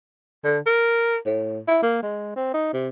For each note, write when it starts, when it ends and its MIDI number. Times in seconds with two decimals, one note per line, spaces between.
0.44 0.59 50
0.66 1.17 70
1.26 1.61 45
1.68 1.78 64
1.83 2.01 58
2.03 2.32 56
2.36 2.49 60
2.54 2.72 63
2.73 2.89 48